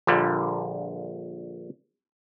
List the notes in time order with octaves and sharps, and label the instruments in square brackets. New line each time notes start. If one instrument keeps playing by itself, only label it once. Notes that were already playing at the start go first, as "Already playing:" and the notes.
[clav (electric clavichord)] A#1 A#2 D3 G3